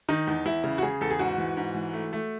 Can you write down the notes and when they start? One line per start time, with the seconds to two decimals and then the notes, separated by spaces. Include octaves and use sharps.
0.09 D#3 D#4
0.27 E2
0.45 E2 E4
0.64 C#3
0.78 F#4
0.82 C#3 G#4
1.01 E2 A4
1.11 G#4
1.19 G#2 F#4
1.38 E3
1.57 G#2
1.75 E3
1.93 A3
2.13 A3